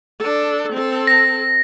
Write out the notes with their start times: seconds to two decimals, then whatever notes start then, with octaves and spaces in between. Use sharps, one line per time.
0.20 D4 A4
0.73 C4 A4
1.07 A#6